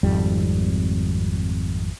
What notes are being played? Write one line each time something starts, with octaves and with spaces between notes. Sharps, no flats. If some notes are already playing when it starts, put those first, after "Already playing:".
G#1 F2 G3